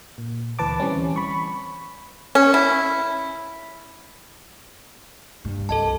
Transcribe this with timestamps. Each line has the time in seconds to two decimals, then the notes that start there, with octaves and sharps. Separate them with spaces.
0.18 A#2
0.59 D2 E3 B4 A5 D6
0.80 E3 G3 C4 C#4
1.16 B5 C#6
2.35 C#4
2.54 E4
5.45 G2 G3
5.69 C2 A4 D#5 A5